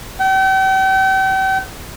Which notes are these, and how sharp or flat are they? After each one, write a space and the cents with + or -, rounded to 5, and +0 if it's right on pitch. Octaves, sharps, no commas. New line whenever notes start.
G5 -40